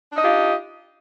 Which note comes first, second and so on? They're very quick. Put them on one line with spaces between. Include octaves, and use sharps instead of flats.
D4 D#4 D#5 G4 F4